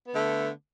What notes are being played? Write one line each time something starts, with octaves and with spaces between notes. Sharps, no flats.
D3 A3 B3